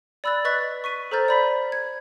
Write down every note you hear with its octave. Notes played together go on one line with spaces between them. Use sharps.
D5 B5 E6 F#6 A6
B4 D#5 C#6 F#6 A6 B6
C#6 B6 D#7
A4 C5 A#5 F6 G6 A6
D5 B5 B6
G#6